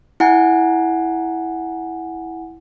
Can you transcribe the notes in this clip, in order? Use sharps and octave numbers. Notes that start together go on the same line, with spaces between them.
E4 F#5 G#5